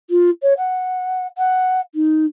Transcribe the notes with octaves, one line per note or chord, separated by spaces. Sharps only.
F4
C#5
F#5
F#5
D#4